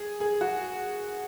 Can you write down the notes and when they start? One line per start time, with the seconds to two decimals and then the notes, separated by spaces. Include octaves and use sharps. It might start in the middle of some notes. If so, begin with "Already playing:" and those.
Already playing: G#4
0.20 G#4
0.41 F#4